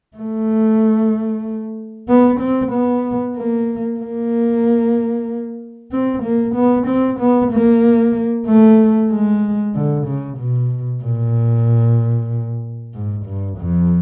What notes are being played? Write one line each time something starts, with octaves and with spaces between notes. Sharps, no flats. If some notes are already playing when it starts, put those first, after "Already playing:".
A3
B3
C4
B3
A#3
A#3
C4
A#3
B3
C4
B3
A#3
A3
G#3
D3
C#3
B2
A#2
G#2
G2
F2